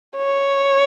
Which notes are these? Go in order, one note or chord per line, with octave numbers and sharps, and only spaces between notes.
C#5